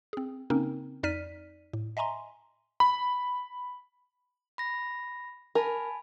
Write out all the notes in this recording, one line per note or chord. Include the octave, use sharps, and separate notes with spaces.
C4 G#4
C#3 A#3 C4 C#4 D#4 A#4
F2 D#4 D5 F6 B6 D#7
A2
D#5 E5 G#5 A#5 C6
B5
B5 A#6
A#4 G#5 A5 B5